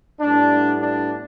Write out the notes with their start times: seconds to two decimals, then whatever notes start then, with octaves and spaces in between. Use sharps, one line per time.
0.21 A2 G3 B3 D4
0.81 D4